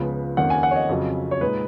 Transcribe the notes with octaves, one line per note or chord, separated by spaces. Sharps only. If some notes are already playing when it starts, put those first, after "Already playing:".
Already playing: C#2 C#3 F3 B3
F2 D#3 A#3 C#4 F#5
G#5
F#5
C#5
D#5
F2 C#3 F#3 C#4
C#5
A#2 G#3 D#4 B4